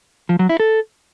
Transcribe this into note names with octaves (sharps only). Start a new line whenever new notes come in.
F3
F#3
E4
A4